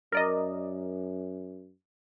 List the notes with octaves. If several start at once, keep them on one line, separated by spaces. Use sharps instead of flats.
F#2 A#4 D5 D#5